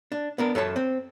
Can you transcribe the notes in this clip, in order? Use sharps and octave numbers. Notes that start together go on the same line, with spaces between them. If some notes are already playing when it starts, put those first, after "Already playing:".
D4
B3 D4 A#4
F#2 A4 C#5 A5
C4